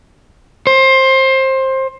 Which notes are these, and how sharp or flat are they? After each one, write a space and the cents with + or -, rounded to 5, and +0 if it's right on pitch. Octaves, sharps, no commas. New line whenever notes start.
C5 +20